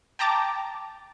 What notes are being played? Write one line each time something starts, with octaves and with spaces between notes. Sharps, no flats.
G5 A5 A#5 D6 A6